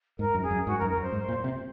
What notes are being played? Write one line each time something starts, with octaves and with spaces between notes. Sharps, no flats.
G#2 A#4
F#2
G#4
F#2
G#2 F#4
A#4
F#2
A#4
F#2
C5
G#2
A#2
C3